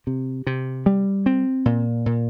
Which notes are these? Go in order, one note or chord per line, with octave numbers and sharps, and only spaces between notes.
C3
C3
G3
C4
A#2
A#2